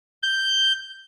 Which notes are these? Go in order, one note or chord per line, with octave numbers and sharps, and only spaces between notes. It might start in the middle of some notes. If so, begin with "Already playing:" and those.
G6